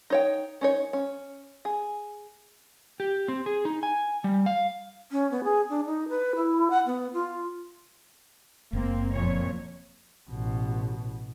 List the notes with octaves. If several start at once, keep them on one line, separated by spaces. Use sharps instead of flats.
D#4 C#5 G5
C#4 D#4 C#5
C#4
G#4
G4
C4
G#4
D#4
G#5
G3
F5
C#4
B3
G#4
D4
D#4
B4
E4
F#5
B3
F4
F#1 A#3 C4
F2 A#2 C#5
A1 B2